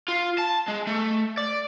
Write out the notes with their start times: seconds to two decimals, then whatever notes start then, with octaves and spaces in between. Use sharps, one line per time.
0.09 F4
0.39 A5
0.68 G#3
0.87 A3
1.37 D5